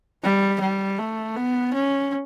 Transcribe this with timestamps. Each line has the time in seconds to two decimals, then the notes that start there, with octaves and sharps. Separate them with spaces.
0.24 G3
0.61 G3
0.99 A3
1.37 B3
1.74 C#4